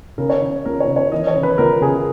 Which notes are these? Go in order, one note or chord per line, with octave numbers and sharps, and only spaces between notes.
C#3 A#4
C#5
C#3
C#2 A#4
C#5
C#3
C#5
E3 D#5
C#5
C#3
B4
C#2 A#4
C#3 G#4